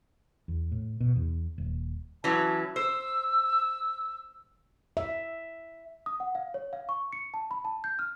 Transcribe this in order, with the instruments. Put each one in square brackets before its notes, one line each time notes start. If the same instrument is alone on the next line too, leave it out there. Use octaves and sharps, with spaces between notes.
[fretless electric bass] E2
A2
B2
E2
D#1
[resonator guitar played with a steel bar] E3 F#3 C#4 [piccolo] A5
[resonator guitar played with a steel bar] C5 [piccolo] E6
[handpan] E5
[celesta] D#6
F#5
F5
C#5
F5
C#6
C#7
A5
B5
A5
G6
F6